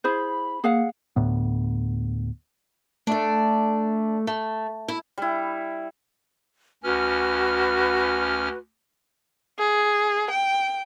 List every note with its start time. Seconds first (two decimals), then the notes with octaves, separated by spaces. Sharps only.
0.04 E4 G#4 C5 B5
0.64 A#3 G#4 F5 F#5
1.16 D2 A2 B3
3.07 A3 D4 D5
4.27 A3
4.88 E4
5.18 G3 E4
6.83 D2 C#4 F#4 B4 F6
9.59 G#4
10.31 G5